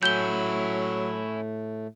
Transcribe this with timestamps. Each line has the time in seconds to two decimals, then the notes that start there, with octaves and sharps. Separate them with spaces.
0.03 A2 F#3 A3 C#4 E4 G6 G7